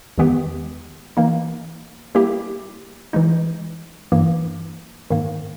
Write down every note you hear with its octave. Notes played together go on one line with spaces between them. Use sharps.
E2 D#3 G#3 B3 G4
E3 A#3 D#4
G3 A#3 E4 G4
E3 G#3 D#4
G2 E3 A#3
G#2 D#3 A#3